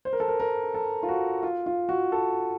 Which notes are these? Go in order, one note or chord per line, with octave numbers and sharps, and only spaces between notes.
C5
A#4
A4
A#4
A#4
A4
F4
F#4
F4
F4
F#4
A4